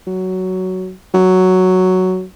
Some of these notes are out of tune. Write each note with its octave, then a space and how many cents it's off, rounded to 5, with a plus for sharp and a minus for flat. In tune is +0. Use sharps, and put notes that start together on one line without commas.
F#3 +10
F#3 +5